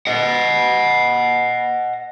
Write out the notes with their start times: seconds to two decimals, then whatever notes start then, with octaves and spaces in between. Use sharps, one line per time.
0.07 D#5 F#5